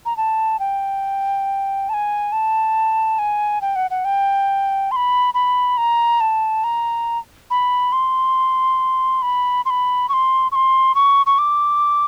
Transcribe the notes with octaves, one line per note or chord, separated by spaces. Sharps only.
A#5
A5
G5
A5
G#5
A5
G#5
G5
F#5
F#5
G5
C6
B5
B5
A#5
A5
A#5
B5
C6
B5
C6
B5
C#6
C6
C#6
C6
C#6
C#6
D6